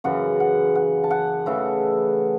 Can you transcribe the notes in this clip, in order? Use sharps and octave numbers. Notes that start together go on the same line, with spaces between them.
F#2 C#3 E3 F#5
F#5
F#5
A5
F#5
C#3 E3 A3 E5